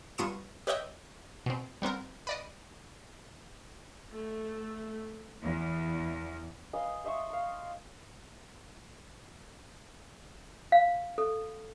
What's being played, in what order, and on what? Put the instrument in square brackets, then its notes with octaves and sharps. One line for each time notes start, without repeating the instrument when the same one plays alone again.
[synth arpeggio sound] G2 B3 F4 C#6 D#6 E7
G4 B4 C#5 D#5 E5 G5
B2 C4
G3 B3 C4 A#4
B4 D5 D#5
[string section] A3
E2
[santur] B4 D#5 F5 G#5
C5 D#5 E5 C#6
F5 A#5
[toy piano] F5
A4